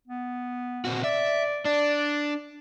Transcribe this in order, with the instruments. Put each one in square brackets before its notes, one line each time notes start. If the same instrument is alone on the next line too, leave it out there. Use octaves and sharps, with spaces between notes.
[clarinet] B3
[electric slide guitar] A#2 C4 F#4
[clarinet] D5 [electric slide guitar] E5
[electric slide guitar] D4 [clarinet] D5